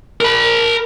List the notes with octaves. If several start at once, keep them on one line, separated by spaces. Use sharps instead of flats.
A#4 B5